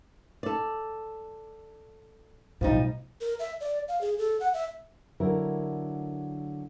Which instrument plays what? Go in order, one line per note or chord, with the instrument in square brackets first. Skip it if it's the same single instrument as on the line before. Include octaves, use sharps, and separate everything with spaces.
[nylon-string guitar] A4 D5
[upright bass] B1 A2 [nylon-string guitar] F3 G3 D#4
[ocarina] A#4
E5
D5
F5
G#4
A4
F#5
E5
[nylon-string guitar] D3 F#3 E4 A#4